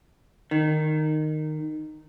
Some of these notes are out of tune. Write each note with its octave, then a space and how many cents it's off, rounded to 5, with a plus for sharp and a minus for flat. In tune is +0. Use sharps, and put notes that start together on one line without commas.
D#3 -15